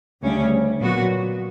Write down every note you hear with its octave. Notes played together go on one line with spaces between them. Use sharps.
D2 C#3 G3 C#4
A#2 F#3 B3 F#4